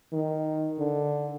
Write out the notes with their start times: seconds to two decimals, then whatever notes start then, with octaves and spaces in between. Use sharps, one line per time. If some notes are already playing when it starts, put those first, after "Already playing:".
0.13 D#3
0.79 D3